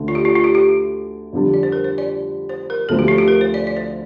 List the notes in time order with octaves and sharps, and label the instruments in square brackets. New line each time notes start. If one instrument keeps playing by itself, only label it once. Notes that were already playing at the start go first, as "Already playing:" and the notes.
Already playing: [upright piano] D2 D3 A3
[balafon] F4
G4
F4
F4
G4
G4
[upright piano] F2 D3 G3 D4
[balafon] D5
C5
A#4
C5
D5
C5
A#4
[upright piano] D2 D3 F3 A3 C4 [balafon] A4
[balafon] G4
F4
G4
A#4
C5
D5
D5
C5